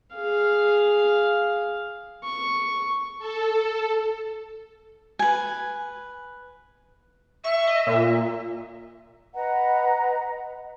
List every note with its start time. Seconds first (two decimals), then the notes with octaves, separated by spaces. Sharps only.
0.14 G#4 F5
2.24 C#6
3.19 A4
5.19 B4 G#5
7.44 E5 C#6
7.67 D#5
7.86 A#2
9.34 B4 D#5 F#5 A#5